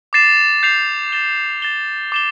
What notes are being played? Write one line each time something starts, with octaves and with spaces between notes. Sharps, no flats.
D6 A6 C7 E7
G6 C7 F7
A6 E7 G7
A6 E7 G7
D6 A6 E7 G7